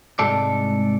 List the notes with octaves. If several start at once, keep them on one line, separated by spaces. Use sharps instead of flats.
C2 G#2 G#3 A4 D5